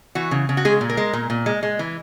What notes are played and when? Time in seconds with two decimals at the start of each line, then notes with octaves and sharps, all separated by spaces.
0.15 E3 F#4
0.31 C#3
0.49 C#3
0.57 F#4
0.65 G#3 G#4
0.81 A#2
0.90 A#4
0.97 G#3
1.13 A#2
1.30 A#2
1.46 G#3
1.63 G#3
1.79 E3